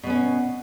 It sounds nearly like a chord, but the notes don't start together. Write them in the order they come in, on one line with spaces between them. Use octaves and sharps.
B2 B3 C#4